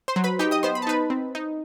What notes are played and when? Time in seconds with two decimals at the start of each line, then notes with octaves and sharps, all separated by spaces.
0.08 C5 C6
0.16 F#3
0.24 B4 B5
0.39 D#4 G4 G5
0.51 D#5 D#6
0.63 B3 C5 C6
0.75 B5
0.82 A5
0.87 D#4 B4 B5
1.10 C4
1.35 D#4